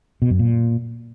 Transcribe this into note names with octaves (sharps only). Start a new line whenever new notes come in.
B2
F#2
A#2